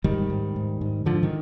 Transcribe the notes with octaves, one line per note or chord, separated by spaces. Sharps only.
G#2 D#3 G3
G#2
G#2
G#2
G#2 D3 F3
D#3